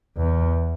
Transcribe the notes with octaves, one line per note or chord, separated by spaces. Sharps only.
E2